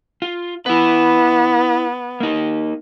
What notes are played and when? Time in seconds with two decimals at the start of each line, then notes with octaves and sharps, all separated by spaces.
0.22 F4
0.66 B3 E4 B4
2.20 A#3 D#4